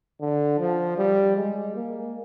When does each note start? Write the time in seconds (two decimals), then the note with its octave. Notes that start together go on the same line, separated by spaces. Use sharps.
0.21 D3
0.59 F3
0.98 G3
1.37 G#3
1.76 A#3